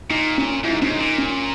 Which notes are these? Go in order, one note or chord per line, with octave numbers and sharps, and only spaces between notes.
A#2 D#4
C#4
G#2 E4
D#4
G#2 C#4
D#4
A#2
C#4